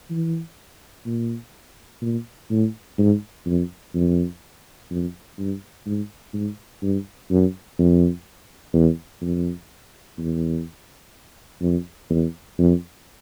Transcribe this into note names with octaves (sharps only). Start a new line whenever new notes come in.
E3
A#2
A#2
A2
G#2
F2
F2
F2
G2
G#2
G#2
G2
F#2
F2
E2
F2
E2
F2
E2
F2